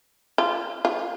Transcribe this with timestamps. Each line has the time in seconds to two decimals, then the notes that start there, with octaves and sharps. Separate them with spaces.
0.38 F4
0.85 F4